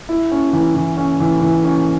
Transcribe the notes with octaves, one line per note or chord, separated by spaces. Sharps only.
E4
C#4
E3
E3
C#4
E3
E3
C#4